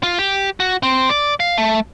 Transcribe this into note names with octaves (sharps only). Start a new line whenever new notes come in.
F4
G4
F#4
C4
D5
F5
A3